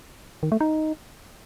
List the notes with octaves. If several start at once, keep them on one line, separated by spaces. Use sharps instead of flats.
D#3
A3
D#4